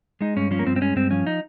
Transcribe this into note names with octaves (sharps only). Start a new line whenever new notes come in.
G#3 D#4
G2 C#4
F3 C#4
A#3
G2 C4
C4
G#3 C#4
G2 C4
F3 C#4
D#4